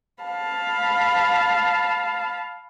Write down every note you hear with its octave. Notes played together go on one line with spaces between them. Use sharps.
F5 A5 B5